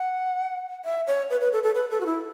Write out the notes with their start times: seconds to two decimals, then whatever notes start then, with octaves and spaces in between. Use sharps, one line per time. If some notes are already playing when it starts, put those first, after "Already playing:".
Already playing: F#5
0.85 E5
1.07 C#5
1.30 B4
1.41 B4
1.53 A4
1.63 A4
1.75 B4
1.90 A4
2.01 F#4
2.06 E4